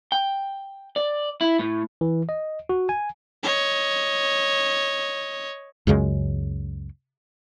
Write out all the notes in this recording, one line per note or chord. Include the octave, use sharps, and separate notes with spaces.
G5
D5
E4
A2
E3
D#5
F#4
G#5
C#5 D#5
C#2 F#2 C#3 G#3